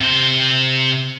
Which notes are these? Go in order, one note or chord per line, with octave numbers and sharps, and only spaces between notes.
C3 C5